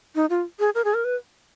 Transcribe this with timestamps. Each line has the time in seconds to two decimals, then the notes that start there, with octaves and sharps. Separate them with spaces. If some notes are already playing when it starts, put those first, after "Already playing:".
0.15 D#4
0.30 F4
0.60 G#4
0.75 A#4
0.85 G#4
0.94 A#4
1.05 B4